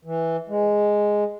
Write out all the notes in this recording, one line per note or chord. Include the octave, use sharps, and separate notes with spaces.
E3
G#3